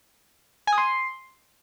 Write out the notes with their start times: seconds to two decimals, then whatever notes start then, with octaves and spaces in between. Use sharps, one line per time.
0.67 G#5
0.73 D#6
0.78 C6